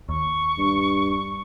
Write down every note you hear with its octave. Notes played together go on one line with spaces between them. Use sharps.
D#2 C#6
G2